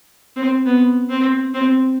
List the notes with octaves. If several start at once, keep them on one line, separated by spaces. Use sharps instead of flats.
C4
B3
C4
C4